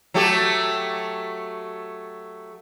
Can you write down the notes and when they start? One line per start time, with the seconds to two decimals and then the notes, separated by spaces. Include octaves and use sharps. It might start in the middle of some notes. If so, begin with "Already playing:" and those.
0.14 F#3 A3 G4